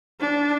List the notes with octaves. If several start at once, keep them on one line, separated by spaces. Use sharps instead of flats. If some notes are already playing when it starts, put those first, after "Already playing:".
D4